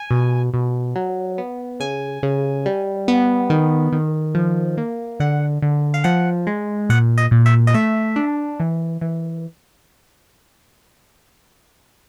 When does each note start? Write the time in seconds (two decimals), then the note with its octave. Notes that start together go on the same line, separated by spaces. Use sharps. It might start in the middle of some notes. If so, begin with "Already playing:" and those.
Already playing: G#5
0.11 B2
0.54 B2
0.95 F#3
1.38 B3
1.80 C#3 G#5
2.23 C#3
2.66 G3
3.08 B3
3.50 D#3
3.92 D#3
4.35 F3
4.77 A#3
5.20 D3 F#5
5.62 D3
5.94 F5
6.04 F3 F#5
6.47 G#3
6.89 A#2 F#5
7.18 D#5
7.31 A#2
7.46 E5
7.67 D#5
7.74 A3 E5
8.16 D4
8.60 E3
9.01 E3